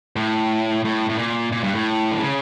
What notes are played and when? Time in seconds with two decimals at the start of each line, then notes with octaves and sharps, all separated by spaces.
0.16 A2
0.85 A2
1.09 A2
1.18 A#2
1.52 A#2
1.64 G2
1.75 A2
2.12 D3
2.19 C#3